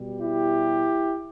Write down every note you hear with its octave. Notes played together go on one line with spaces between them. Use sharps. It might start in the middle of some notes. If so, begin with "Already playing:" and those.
Already playing: B2 G3
E4 G4